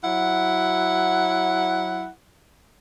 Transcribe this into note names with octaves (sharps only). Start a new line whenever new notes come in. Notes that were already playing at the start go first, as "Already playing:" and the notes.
F#3 E4 F#5